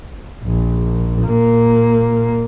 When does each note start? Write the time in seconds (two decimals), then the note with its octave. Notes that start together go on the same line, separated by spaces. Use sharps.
0.44 A#1
1.23 A#2 A#3